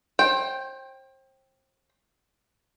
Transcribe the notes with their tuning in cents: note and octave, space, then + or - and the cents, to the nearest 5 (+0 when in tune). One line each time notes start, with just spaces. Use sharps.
C5 +35 G5 +0